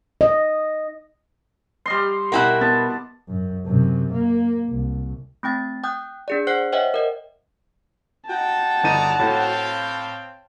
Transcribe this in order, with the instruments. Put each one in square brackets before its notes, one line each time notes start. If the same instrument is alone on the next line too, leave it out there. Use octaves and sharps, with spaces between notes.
[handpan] D#5
[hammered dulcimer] G3 D#5 C6
[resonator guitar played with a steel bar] B2 E4 A#4 [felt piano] F#5 G5 F#6
[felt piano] B3 [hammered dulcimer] A5
[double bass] F#2
F#2 C3
A#3
C2
[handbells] A3 C4 G5 A6
G5 D#6 F#6 G6
D4 G#4 D5
C5 F#5 F#6 C7
C5 C#5 D#5 E5 F#5 G5
A#4 D#5
[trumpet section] D#4 G5 [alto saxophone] F#4 [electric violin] A5
[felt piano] G1 D#4 D#7 [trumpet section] D5 D#5 A#5
[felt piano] A2 [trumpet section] C4 F5 G5